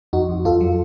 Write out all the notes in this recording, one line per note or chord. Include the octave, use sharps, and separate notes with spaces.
F2 D#4 F#4
F2
F2 F4 A4
F#3